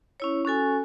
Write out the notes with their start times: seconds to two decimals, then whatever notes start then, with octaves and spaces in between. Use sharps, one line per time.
0.20 C#4 E4 C#5
0.45 C#4 F#4 A4 G#5